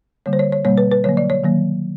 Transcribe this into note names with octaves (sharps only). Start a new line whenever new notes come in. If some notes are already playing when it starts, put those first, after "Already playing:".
D3 G3 A#3 C#5
C5
C#5
C#5
B2 G3 A#3 C#5
B4
B4
D3 F#3 A#3 C#5
D5
C#5
D#3 F#3 A#3